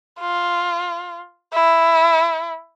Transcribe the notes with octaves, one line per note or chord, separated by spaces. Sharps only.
F4
E4